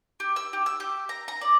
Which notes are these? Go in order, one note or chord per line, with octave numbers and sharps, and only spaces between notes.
G4
E6
G4
E6
G4
A#5
A#5
D5